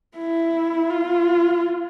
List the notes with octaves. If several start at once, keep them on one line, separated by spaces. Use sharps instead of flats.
E4
F4